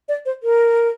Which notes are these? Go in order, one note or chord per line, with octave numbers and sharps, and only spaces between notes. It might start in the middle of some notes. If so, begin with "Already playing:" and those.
D5
C5
A#4